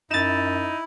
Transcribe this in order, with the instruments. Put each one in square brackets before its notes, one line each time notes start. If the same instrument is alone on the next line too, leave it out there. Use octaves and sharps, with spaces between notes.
[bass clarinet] F#2 [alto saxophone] D#4 [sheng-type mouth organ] E4 [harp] A6 E7